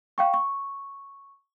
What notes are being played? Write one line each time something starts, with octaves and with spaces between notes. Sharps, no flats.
F5 G5 C#6
C#6